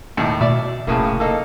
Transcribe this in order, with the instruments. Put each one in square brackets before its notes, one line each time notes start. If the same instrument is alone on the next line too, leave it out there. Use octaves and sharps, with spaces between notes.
[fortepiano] D#2 A2
[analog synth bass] B2 [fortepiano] D5 E5
[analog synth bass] F1 [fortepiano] A2 C#3 A#3
[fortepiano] A#3 D#4 A4